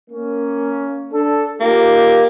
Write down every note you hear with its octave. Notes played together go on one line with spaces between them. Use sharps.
A#3 C#4
D4 A4
A#3 D#4 F4 G4